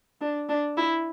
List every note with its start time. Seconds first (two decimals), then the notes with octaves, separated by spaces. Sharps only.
0.21 D4
0.49 D4
0.77 E4